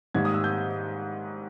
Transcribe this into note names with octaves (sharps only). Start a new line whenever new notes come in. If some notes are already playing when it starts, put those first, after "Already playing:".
G#2 D#3 G3 A#3 G#6
D#6
E6
G6